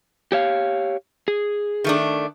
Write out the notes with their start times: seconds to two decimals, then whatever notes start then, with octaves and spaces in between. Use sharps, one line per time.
0.32 G4 C#5 F5
1.28 G#4
1.84 D#3 A3 D4